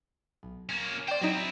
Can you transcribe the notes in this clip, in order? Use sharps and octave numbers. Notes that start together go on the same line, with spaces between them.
B1
A#3 C#4
C5 D5 G5
F#3 C4 D#4 E4